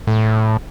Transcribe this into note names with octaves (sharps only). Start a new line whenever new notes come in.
A2